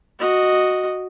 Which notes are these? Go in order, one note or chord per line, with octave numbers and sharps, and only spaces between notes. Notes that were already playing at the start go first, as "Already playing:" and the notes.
F#4 D#5